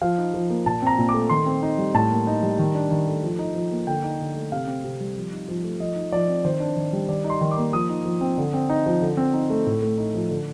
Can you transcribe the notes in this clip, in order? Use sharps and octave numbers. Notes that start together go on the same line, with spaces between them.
F3 F5
D#4
F3
A#3
A#2 A5
C4 A#5
A#2
D6
A3
D#3 C6
C4
D#4
G3
A2 A5
A#3
D#4
G3
D#3
D4
D#3
A3
F3
D#4
F3
A#3
D3 G5
D#4
D3
A3
C3 F5
C4
C3
G3
F3
D#4
F3
A3
F3 D#5
D#4
F3 D5
C4
D#3 C5
D4
D#3
G3
D#3 D5
D#4
C6
D#3
D6
A#3
F3 D#6
D#4
F3
C4
D3
C4
D#4
F3
D3
C4
D#4
A3
A2
A3
D#4
F3
D3